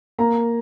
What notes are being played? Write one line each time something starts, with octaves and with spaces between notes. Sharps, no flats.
A#3 A#5